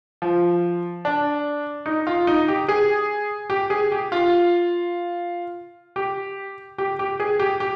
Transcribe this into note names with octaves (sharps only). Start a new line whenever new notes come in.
F3
D4
D#4
F4
D#4
G4
G#4
G4
G#4
G4
F4
G4
G4
G4
G#4
G4
G4